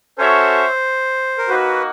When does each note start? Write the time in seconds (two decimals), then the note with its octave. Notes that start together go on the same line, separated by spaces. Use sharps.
0.18 C#4 F#4 A4 C5 C#5 E5
1.38 A#4
1.49 A#3 D#4 F#4 B4